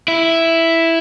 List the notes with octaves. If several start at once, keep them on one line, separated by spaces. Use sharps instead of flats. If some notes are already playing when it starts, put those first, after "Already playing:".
E4